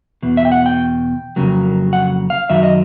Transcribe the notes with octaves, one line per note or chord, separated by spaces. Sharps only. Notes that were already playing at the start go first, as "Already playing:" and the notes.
E2 B2
E5
G5
F#5
G5
F2 C#3 F#3 A#3
F#5
F5
F#2 D#3 F#3 E5
D#5